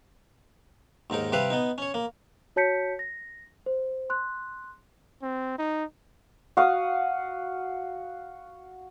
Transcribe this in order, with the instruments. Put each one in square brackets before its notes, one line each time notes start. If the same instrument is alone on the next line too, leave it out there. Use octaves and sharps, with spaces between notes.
[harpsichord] D#2 G#2 D#4 A#4
C3 G3 B4 E5 F5
B3 D#4
C#4 C#5
A#3
[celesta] F#4 C#5 A5 G6 B6 C#7
A#6
C5
C6 F#6
[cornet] C4
D#4
[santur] F#4 F5 D#6